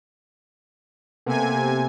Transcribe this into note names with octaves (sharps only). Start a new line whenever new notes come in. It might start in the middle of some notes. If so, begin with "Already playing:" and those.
C3 A#3 B3 A4 G#5